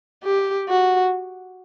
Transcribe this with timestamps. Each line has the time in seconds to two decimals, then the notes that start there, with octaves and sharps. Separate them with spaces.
0.24 G4
0.69 F#4